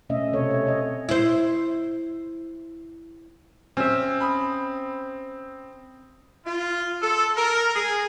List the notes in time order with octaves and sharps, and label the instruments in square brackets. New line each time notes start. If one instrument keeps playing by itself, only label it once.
[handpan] B2 A3 C#4 D#5 E5
C3 B3 C4 A4 C#5
C#5 E5
C4 C#5 D#5
[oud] E4 C5
[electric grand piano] C4 [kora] C#4 E5
[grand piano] B5 D#6
[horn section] F4
A4
A#4
G#4